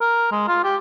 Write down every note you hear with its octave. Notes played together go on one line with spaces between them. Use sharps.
A#4
G#3
F4
G4